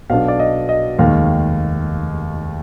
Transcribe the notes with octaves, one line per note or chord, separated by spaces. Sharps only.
B1 B2 B3 D4 F5
D5
D#5
D#5
F1 D#2 D#3 G#3 F5